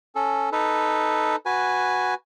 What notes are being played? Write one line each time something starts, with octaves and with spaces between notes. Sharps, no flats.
C#4 A4
D#4 A4 B4
F#4 B4 G#5